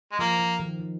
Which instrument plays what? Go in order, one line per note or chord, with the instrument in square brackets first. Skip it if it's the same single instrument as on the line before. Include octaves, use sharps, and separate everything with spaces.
[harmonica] G#3
[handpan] F3 [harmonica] A#3
[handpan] F3
D#3
F3